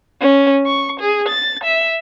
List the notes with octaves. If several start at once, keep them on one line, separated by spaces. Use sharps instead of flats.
C#4
C#6
G#4
A6
E5